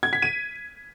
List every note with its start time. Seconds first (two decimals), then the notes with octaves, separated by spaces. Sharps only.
0.03 G#6
0.13 B6
0.22 D#7